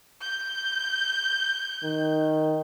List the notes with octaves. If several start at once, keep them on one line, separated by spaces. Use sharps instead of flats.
G6
D#3